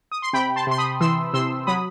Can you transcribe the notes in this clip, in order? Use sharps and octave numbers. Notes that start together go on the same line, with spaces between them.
D#6
C6
C3 G5 B5
A5 C6
C3 C6
B5 D#6
E3 C6 E6
C3 C6 E6
F#3 B5 D#6